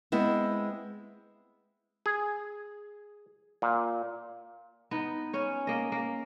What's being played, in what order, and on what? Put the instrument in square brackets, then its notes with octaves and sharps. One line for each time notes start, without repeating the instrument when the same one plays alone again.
[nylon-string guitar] G#3 B3 C4 E4
[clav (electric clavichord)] G#4
A#2
[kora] B3 D#4
C#4 C#5
A#3 D#5
A#3